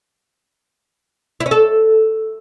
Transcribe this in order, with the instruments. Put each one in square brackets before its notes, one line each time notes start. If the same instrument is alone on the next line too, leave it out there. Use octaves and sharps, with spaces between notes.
[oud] E4
C#4
A4